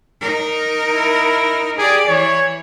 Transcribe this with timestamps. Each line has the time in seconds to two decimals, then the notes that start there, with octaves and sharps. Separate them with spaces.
0.21 D#4 A#4
0.89 E4
1.78 G4 G#4 D5
2.08 E3 C#5